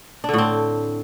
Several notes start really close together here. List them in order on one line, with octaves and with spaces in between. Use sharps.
D4 D3 A2 C4